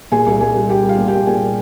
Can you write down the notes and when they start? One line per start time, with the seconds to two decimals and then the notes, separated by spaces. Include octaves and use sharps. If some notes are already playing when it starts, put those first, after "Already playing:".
0.12 A#2 G#4 G#5
0.27 C2
0.41 C2 G#4 G#5
0.56 C2
0.69 G3 G4 G5
0.83 C2
0.89 F4 F5
0.98 A#2
1.07 G4 G5
1.13 C2
1.27 A#2 G#4 G#5